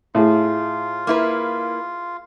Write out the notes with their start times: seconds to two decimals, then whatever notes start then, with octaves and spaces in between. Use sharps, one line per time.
0.15 A2 F4 G#4 E5
1.07 A#3 E4 B4